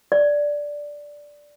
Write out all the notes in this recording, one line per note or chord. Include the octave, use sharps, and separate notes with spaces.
D5